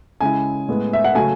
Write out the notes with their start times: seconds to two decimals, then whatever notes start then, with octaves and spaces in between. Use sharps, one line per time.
0.21 C#3 G#3 C#4 E4 G#5
0.69 A2 G#3 B3 E4
0.93 E5
1.05 F#5
1.15 C#3 F#3 A3 C#4 G#5